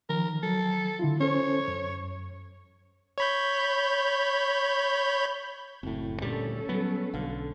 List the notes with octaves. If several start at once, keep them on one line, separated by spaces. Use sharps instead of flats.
D#3 F3 A#4
F#3 A4
D3 E4 F4
C#4 A4 C5 C#5
F#2
C#5 B5 G6
F#1 A2 C4
D2 A#2 G3 C#4 A4
F#3 G3 B3
B1 D3 F5